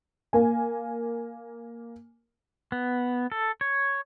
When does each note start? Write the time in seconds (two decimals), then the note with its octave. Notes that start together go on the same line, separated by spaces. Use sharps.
0.33 A#3 G#5
2.72 B3
3.32 A4
3.61 C#5